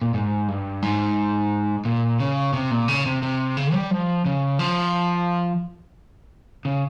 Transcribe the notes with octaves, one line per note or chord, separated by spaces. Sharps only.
A#2
G#2
G2
G#2
A#2
C#3
C3
A#2
C#3
C3
C3
C#3
G3
F3
C#3
F3
C#3